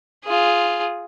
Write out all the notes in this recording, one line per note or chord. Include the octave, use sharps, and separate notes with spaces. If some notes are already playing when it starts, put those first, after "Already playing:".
F4 G#4